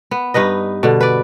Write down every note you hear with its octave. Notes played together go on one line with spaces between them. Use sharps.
B3
G2 D#4 B4 D#5
B2 D3
B4 D5